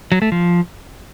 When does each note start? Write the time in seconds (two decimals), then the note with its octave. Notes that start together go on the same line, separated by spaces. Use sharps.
0.12 F#3
0.22 A3
0.32 F3